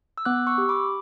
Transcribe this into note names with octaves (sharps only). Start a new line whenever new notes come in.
E6
B3 D6 F#6
C#6 E6
G4
B5 D6